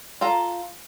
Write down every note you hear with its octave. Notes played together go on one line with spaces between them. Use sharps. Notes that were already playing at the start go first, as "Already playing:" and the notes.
F4 A4 A#5